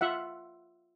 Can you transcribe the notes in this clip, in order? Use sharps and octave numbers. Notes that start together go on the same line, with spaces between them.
F4 E5 F#5